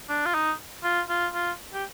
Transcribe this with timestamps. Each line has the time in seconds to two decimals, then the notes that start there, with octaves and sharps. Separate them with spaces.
0.09 D4
0.26 F4
0.34 D#4
0.84 F4
1.09 F4
1.34 F4
1.74 G4